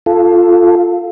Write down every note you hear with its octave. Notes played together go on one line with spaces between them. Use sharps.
F4 A4